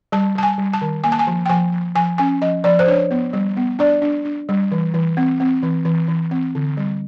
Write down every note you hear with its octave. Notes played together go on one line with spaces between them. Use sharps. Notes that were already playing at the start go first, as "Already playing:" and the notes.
G3 A5
G3 A5
G#5
G3
A5
D#3
A#3 G#5
A5
G#5
F3
G5
F3 G#5
F3
F3 G#5
C#4 G#5
F3 D#5
F3 D5
C5
D4 C#5
B3
G3
B3
D4 D5
D4
D4
G3
E3
E3
C4
C4
E3
E3
E3
C4
D3
G3